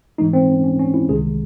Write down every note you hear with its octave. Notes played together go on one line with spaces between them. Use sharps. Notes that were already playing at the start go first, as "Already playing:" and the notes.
G#2 E3 G#3 D#4
C4
C#4
C#4
C#4
E4
C2 C3 D#3 G#3 G#4